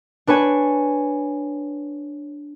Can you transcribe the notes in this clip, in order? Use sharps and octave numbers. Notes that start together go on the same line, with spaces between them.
D4 B4 C#5 G#5